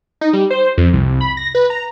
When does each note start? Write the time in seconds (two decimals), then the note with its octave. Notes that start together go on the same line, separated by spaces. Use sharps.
0.21 D#4
0.33 G3
0.50 C5
0.78 F2
0.93 C2
1.21 B5
1.37 A#6
1.55 B4
1.70 A#5